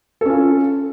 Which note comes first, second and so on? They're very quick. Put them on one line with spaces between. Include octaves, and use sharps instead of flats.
A4 C#4 F4